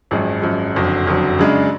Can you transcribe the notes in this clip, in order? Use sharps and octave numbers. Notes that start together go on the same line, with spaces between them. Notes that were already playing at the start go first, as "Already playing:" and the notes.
G#1 F#2 F3 G#3
G#1 F#2 F3 G#3
F#1 F2 D3 F#3
F#1 F2 D3 F#3
F#2 C#3 G#3 D4